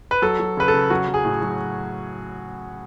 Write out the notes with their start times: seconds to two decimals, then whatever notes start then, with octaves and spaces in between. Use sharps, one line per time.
0.11 B4
0.22 F#3 A4
0.40 F#3
0.57 C#3 B4
0.68 A4
0.74 C#3
0.90 F#3 F#4
1.08 F#3
1.14 G#4
1.24 A2
1.42 F#3